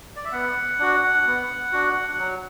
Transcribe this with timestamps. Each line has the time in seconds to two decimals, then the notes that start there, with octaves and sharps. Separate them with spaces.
0.16 D5
0.25 E5
0.32 B3 F#5
0.79 D4 F#4
1.26 B3
1.72 D4 F#4
2.19 F#3